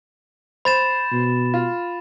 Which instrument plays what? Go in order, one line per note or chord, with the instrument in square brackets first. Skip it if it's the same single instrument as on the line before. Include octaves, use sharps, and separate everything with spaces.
[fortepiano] C5 [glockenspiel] B5 A6 E7
[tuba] B2
[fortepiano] F4